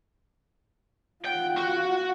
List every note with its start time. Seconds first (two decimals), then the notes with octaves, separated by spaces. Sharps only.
1.25 F4 F#5 G5
1.57 F#4